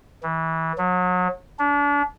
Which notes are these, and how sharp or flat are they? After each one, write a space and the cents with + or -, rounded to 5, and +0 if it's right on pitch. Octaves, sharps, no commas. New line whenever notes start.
E3 -25
F#3 -35
D4 -35